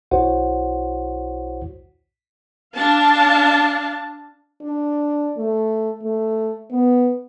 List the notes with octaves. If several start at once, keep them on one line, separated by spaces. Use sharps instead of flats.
B1 E4 F#4 C5 C#5 F#5
D4 F5 A5
D4
A3
A3
B3